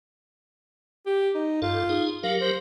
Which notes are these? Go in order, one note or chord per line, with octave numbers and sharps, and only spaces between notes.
G4
D#4
G2 F4 A4
D#4 G#4
F#3 G4 A#4 F5
C5